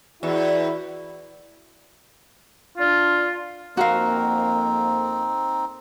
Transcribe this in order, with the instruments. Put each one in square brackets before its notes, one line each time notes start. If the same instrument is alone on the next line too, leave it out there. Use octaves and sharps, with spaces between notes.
[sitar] E2 [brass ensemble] E4 F#4
[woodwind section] D4 F4
[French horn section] F2 A#3 [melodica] C4 D#4 [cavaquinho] F#4 A#4 F5